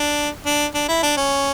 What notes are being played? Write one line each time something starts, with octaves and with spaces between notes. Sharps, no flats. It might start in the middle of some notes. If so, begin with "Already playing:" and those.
Already playing: D4
D4
D4
E4
D4
C#4